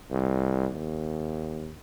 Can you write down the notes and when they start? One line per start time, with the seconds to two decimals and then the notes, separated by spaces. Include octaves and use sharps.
0.11 C2
0.72 D#2